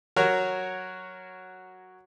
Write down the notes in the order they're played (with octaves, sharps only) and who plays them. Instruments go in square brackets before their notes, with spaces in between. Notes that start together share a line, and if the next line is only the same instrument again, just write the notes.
[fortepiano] F#3 F#4 A#4 C#5